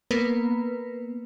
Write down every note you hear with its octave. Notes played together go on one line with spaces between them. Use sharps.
A#3 B3 A#4 B4